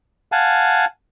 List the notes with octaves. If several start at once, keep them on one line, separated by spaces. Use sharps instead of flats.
F5 F#5 G#5 A5